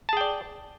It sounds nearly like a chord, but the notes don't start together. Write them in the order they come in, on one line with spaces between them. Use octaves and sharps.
A5 G#4 G5 D5